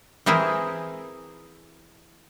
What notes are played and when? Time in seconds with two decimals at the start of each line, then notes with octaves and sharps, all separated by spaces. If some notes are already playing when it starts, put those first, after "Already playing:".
0.26 E3 C4 E4 G#4 A#4